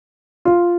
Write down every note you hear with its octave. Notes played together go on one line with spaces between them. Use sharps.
F4